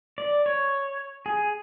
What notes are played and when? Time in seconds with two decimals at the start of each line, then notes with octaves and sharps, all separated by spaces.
0.18 D5
0.46 C#5
1.26 G#4